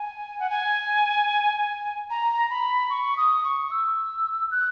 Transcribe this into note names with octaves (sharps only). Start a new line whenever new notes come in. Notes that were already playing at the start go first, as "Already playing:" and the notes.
Already playing: G#5
F#5
G#5
A#5
B5
C#6
D#6
C#6
E6
F#6